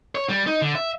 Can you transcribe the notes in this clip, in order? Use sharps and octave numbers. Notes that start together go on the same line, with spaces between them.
C#5
G3
D#4
D3
E5